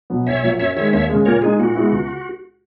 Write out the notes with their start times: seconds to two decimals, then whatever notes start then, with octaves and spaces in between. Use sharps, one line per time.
0.10 B2 F#3 B3
0.27 B1 C#5 E5
0.43 A#2 F#3
0.59 F#2 C#5 E5
0.76 D#3 G#3 C#5 E5
0.93 D#2 C#5 E5
1.09 C#3 G#3
1.25 A#2 A#4 C#5
1.42 G#3 D#4 G#4
1.59 A#2 F#4
1.75 G#3 B3 E4
1.92 C#2